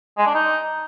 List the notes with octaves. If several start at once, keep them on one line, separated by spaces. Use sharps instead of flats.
G#3
D4
D#4